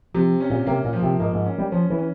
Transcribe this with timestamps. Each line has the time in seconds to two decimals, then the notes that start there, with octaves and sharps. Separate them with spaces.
0.14 C3 F3
0.40 C#4
0.50 A#2
0.67 C3 A#3
0.84 A#2
0.93 F3
1.02 C3
1.19 G#2 A#3
1.33 G#2
1.45 C#4
1.58 G3
1.72 F3 C#4
1.90 E3
1.98 C#4